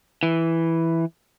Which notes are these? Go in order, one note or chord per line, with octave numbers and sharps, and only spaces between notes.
E3